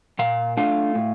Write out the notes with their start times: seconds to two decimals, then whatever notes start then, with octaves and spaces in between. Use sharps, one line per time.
0.19 A#2 F5
0.57 A3 D4 F4 F5
0.95 A2